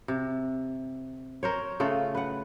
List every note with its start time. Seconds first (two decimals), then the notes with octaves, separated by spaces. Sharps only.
0.08 C3
1.43 A#4 C5 C#5
1.80 C#3 A3 F4
2.15 B4 F#5